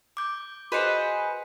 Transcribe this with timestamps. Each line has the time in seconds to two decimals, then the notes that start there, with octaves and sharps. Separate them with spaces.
0.17 D6 G6
0.72 F#4 G#4 B4 C5 D#5 C#7